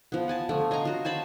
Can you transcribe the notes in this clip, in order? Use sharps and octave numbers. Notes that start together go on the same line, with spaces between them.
F3 B3
F#5 G#5 A5
D3 F3 A3
C#5 D#5 F5 A#5
F4 F#4
C5 C#5 A5 B5